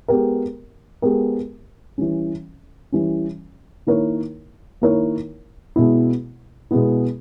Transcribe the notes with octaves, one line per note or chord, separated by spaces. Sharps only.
G#3 B3 G4 A#4
G#3 B3 G4 A#4
E3 G3 C#4
E3 G3 C#4
D#3 A#3 E4 A#4 C#5
D#3 A#3 E4 A#4 C#5
B2 G#3 B3 E4
B2 G#3 B3 E4